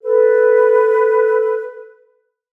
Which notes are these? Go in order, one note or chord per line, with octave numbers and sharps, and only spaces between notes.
A4 B4